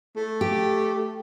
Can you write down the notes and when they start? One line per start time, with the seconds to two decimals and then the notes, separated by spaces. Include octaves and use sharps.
0.17 A3
0.41 G4